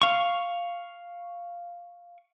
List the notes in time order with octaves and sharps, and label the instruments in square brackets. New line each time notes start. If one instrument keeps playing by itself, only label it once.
[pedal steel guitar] F5 C#6